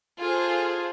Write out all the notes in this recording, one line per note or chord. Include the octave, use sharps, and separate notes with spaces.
F4 G#4 A4 C5